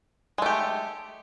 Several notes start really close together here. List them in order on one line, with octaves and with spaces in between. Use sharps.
G#3 A3 G4